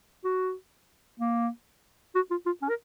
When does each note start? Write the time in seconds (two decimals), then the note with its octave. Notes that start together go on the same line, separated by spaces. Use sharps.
0.24 F#4
1.20 A#3
2.15 F#4
2.31 F4
2.46 F4
2.62 C#4
2.69 A#4